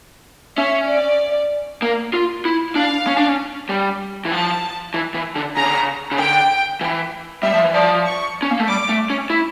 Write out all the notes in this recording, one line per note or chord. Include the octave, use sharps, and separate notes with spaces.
C#4 E5
D5
A#3
F4
E4
D4 F5
C#4
D4
C#4
G3
E3
F3 A5
E3
E3
D3
C#3 A#5
D3
C#3
C#3
D3 G5
E3
G3 E5
F3
E3
F3 D5
C#6
C#4
A#3
A3
G3 D6
A3
C#4
E4